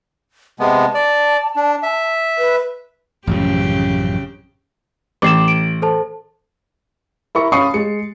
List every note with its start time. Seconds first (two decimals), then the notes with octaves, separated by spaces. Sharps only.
0.59 C3 G#3 B3 A5
0.95 D5
1.56 D4
1.83 E5
2.38 B4
3.27 A1 F#2 C#3 F3 G4
5.22 A1 D6 C7 E7
5.48 D7
5.82 A4 C5 A5
7.35 E4 A#4 C#6
7.52 C#4 F5 B5 C#6 D#6 C7
7.74 G#3 C#7